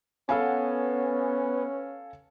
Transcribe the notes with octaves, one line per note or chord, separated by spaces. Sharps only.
B3 C#4 A4 F5 G#5